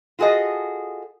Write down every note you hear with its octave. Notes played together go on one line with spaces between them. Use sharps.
F4 F#4 G#4 A4 D#5